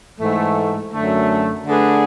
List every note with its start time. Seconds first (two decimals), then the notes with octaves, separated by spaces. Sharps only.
0.20 G#2 E3 A3
0.93 F#2 D3 A3
1.66 D3 A3 D4 G#4 B4